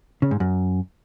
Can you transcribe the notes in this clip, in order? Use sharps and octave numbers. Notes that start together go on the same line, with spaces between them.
C#3
G#2
F#2